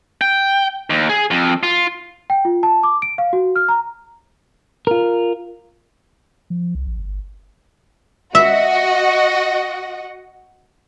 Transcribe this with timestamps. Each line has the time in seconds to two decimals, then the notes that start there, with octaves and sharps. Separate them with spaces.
0.21 G5
0.90 D#2
1.09 G#4
1.31 F2
1.63 F4
2.30 G5
2.45 F4
2.63 A5
2.83 D6
3.02 D7
3.18 F5
3.33 F#4
3.56 F6
3.69 A#5
4.87 F4 A#4
6.50 F3
6.75 C2
6.87 A1
6.99 G1
8.35 F#4 D#5 E5 F#5